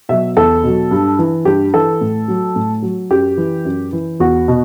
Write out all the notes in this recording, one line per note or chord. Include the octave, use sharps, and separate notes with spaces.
B2 F#3 E5
E2 A4
B2 F#3
G2
E3
G2 G4
E3 A4
A2
F#3
A2
F#3
F#2 G4
E3
F#2
E3
E2 F#4
B2